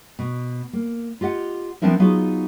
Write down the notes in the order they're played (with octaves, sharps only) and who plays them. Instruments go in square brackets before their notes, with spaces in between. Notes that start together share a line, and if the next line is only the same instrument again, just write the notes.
[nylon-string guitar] B2
A#3
F4 G4 D#5 F#5
F3 B3 C4 D4 E4 A#4
F#3 B3 D#4 F4 F#4 G#4